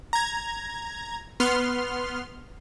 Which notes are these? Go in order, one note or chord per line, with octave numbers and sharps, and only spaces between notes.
A#5 G#6
B3 C6 F6